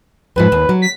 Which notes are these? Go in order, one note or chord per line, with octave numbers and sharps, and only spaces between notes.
F2 G#2 F3 B4
D#2
F#3
B6